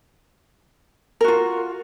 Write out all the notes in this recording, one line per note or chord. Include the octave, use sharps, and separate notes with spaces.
F4 F#4 A#4